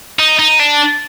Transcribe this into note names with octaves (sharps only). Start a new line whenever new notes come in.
D#4
D#4
D4